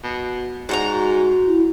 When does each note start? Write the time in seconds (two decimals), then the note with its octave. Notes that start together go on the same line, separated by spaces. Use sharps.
0.03 B2
0.69 G#2 F#4 F#5 A#5
1.47 E4